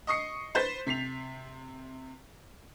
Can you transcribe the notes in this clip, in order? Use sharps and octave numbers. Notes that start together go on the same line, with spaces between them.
D#5 C#6 D#6 C7 C#7
B4 C5 C6 G6 A6 B6
C3 B6 C7 F7